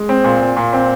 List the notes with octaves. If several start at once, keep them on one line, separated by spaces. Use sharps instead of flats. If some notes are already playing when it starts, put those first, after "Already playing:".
Already playing: G#3
C4
A#2
A#2
A#2
C4